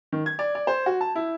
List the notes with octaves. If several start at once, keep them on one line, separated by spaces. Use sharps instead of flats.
D#3
G#6
D5
D5
C5
F#4
A5
E4